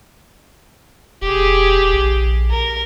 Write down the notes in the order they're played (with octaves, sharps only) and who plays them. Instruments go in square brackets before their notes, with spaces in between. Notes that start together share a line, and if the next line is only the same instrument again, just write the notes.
[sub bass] E1 [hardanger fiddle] G4 G#4
[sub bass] A#1
[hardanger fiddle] A#4